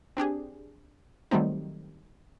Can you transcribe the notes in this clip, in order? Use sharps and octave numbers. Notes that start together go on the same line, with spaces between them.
C4 D4 G4 G#4
D#3 F#3 G3 A3 C4 D#4